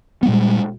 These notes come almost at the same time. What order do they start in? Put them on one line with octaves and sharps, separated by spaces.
B3 G3 A#2 G#3